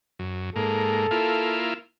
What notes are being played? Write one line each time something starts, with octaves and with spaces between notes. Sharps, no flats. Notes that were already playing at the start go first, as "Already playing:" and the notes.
F#2
G#2 A#3 A4
A#3 E4 F4